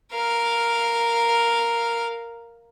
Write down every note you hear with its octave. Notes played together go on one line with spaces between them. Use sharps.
A#4 F5